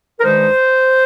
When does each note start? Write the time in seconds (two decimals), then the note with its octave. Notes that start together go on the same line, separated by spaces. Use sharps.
0.20 A#4
0.24 G2 D#3 G#3 D#4 C5